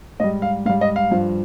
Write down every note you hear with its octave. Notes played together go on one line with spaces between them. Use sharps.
G#2 G3 D#5
F5
G#2 G3 F5
D#5
F5
G2 F3